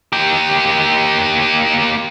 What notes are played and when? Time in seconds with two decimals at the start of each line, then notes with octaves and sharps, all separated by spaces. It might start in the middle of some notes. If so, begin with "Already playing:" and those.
0.13 A#3 G4